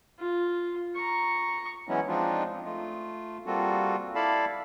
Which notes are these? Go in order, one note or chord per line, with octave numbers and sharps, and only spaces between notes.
F4
A#5 C#6
E3 F#3 G#3 B3 C#4 E4
F3 G#3 C4 D4 D#4 F4
A3 F4
G3 A#3 C4 F4 F#4 A4
E4 A4 D5 F5 A5 B5